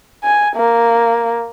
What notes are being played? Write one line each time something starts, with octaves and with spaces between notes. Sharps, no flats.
G#5
A#3